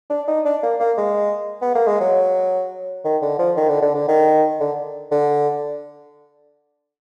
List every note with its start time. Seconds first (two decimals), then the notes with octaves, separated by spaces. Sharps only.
0.10 D4
0.28 D#4
0.45 D4
0.63 A#3
0.80 A#3
0.97 G#3
1.62 B3
1.75 A#3
1.87 G#3
2.00 F#3
3.04 D#3
3.22 D3
3.39 F3
3.56 D#3
3.69 D3
3.82 D3
3.95 D3
4.08 D#3
4.60 D3
5.12 D3